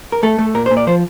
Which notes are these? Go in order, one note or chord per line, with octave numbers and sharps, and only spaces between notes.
A#4
A3 A4
A3
A#2 A#4
C5
A#2
D5
F3 C5